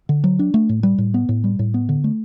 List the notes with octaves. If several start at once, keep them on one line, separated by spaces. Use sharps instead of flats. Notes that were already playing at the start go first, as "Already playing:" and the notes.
D3
F#3
D4
A3
A2
G3
A2
B3
A2
G3
A2
B3
D3
A3